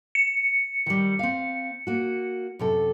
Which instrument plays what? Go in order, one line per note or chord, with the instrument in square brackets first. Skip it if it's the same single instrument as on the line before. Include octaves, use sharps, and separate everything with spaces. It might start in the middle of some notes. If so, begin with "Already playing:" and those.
[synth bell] C#7
[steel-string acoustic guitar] D#3 G3
C4 F5
A#3 F#4
F#2 C3 A4